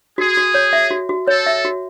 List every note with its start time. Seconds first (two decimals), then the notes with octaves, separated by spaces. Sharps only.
0.18 F#4 G#4
0.37 F#4
0.54 C#5
0.73 E5
0.91 F#4
1.09 F#4
1.27 A4 C#5
1.46 E5
1.65 F#4